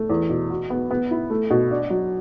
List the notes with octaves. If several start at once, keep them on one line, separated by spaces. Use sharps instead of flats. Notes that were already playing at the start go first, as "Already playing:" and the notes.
Already playing: A3
E2
B2
F#4
B3
B3
E4
A3
B2
D4
F#3